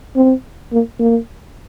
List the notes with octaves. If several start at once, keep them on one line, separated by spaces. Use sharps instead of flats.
C4
A#3
A#3